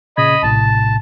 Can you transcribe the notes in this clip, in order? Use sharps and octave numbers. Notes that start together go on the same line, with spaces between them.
A#2 C#3 D#5 B5 G#6
A#1 A2 C3 A5